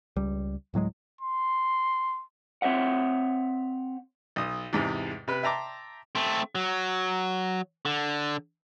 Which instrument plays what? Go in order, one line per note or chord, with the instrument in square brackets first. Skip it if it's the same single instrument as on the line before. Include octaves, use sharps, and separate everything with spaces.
[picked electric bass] C#2 G3
D1 A2 F#3 G#3
[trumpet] C6
[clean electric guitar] C4 C#5 E5 F#5
[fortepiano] B1 D#6
E2 G#2 C3
C3 B4 F#6
E5 G5 A5 A#5 C6 D6
[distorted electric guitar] A3 C4
F#3
D3